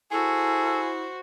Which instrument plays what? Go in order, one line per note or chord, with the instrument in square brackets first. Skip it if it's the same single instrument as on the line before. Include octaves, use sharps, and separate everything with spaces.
[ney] E4 [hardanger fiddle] F#4 C5 [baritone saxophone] G#4 [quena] A4